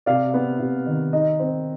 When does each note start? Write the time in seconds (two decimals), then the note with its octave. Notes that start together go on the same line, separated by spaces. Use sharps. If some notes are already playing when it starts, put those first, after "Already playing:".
0.06 C3 D5 F5
0.34 B3
0.60 C3
0.86 D#3
1.13 D#4 D#5
1.39 C4